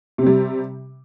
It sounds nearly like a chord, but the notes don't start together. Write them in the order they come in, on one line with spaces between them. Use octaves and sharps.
C3 C4 G3